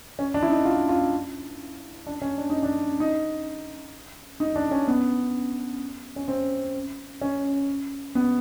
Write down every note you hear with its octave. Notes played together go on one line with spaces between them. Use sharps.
C#4
D4
E4
D#4
F4
F4
D4
C#4
D4
D#4
D4
D#4
D#4
D4
C#4
B3
C#4
C4
C#4
B3